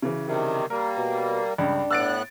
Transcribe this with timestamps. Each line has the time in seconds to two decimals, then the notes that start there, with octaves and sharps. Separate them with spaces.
0.02 C#3 E3
0.26 C3 D#3 G3
0.70 G3 A#3 A#4
0.97 B2
1.58 C#2 G2 D4
1.91 A2 B3 E6 F#6 A6 D7